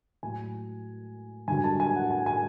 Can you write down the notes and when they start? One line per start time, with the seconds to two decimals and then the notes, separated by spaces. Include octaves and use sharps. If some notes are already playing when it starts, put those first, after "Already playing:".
0.23 A2 F#3 G#5
1.48 G2 D3 F#3 G#5
1.64 A5
1.80 G#5
1.96 F#5
2.11 G#5
2.26 G#5